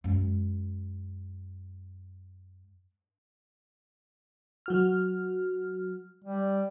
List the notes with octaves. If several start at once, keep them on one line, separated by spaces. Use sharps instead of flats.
F#2 G#3
F#3 F#4 F6
G3